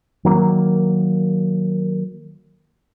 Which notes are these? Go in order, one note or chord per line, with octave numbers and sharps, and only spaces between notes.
D#3 F#3 A#3